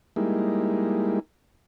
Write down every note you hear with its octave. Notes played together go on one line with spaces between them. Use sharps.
G3 G#3 A#3 D#4 E4